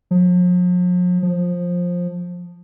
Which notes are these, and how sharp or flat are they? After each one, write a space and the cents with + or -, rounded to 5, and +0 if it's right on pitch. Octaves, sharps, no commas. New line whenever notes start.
F3 +45
F3 +15